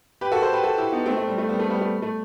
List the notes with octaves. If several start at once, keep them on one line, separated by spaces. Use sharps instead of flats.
G4 B4
F#4 A4
A4 C5
G4 B4
F#4 A4
E4 G4
B3 D#4
A3 C4
A3
G3
A3
G3 B3
A3 C4
G3 B3
A3
A3